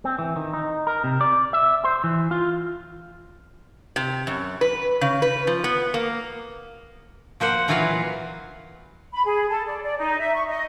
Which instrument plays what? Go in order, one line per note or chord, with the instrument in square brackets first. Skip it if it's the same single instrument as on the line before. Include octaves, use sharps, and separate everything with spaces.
[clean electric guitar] C4
E3
D#3
D#4
A#4
C3
D5
E5
C5
E3
F4
[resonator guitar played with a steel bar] C3
F#2
B4
C#3
B4
F3
B3
A#3
[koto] F3 A#3 C5 F#5
A#2 E3 F#3 F4 B4 F5
[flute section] B5
G#4
A4
D5
D5
D#4
E5
C#6
D#5